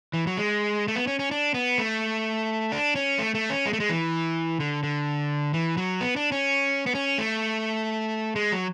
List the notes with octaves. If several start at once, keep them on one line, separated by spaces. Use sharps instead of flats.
E3
F#3
G#3
A3
B3
C#4
C#4
D4
B3
A3
D4
C#4
A3
A3
C#4
G#3
A3
G#3
E3
D3
D3
E3
F#3
B3
D4
C#4
B3
C#4
A3
G#3
F#3